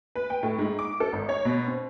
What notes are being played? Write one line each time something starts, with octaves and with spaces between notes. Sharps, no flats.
B4
G5
A2
G#2
D6
A4
G#1
C#5
B2
C4